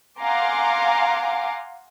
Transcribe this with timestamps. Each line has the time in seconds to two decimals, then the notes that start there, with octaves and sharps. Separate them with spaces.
0.21 F5 F#5 G#5 A#5 C6 D6